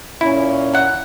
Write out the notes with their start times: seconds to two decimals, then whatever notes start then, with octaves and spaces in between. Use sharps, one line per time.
0.21 A#2 C#4 E4
0.73 F#3 F#5